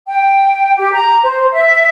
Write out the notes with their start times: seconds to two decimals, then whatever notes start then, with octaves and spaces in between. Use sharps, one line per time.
0.07 G5
0.78 G4
0.93 A#5
1.23 C5
1.53 E5